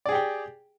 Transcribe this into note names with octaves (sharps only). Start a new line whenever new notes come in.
G4 G#4 D5 G5